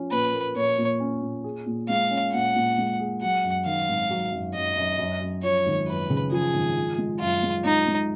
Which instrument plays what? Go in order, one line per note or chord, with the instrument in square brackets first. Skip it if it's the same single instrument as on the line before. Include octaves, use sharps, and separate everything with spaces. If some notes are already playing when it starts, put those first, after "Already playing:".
Already playing: [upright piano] F3 C#4
[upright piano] A#2 [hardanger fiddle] B4
[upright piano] A#3
[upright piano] A#2 [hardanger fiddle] C#5
[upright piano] A#2
C#4
A#2
G#4
A#2
[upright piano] G#3 [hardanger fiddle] F5
[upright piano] C#4
[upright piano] A#2 [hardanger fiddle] F#5
[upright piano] A#2
G#3
G#4
[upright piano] F#3 [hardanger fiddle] F#5
[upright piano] F#2
[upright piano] D#3 [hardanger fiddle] F5
[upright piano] G#1
F#3
F#2
[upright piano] F#2 [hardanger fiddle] D#5
[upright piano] F#2
F#2
F#2
[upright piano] F3 [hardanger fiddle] C#5
[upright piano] G#1
[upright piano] F#2 [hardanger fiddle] B4
[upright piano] C#3
[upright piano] F3 [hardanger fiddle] G#4
[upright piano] G#1
F3
G#3
[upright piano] F#2 [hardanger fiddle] F4
[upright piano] G#3
[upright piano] G#3 [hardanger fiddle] D#4
[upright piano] G#3